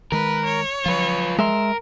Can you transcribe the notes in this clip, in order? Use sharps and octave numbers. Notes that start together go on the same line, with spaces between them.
D#3 G#3 A#4 B4
C#5
F3 F#3 F4 B4
G#3 A#4 E5 C6